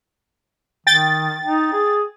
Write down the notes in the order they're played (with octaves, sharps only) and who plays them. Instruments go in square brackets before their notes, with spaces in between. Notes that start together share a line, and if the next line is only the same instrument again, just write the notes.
[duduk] D#3 [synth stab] G5 A6
[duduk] D#4
G#4